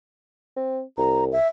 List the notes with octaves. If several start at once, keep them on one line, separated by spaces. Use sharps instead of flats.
C4
C2 A#5
E5